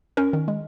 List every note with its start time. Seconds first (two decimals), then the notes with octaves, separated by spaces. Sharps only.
0.17 C#4 A#4
0.33 D#3
0.48 G#3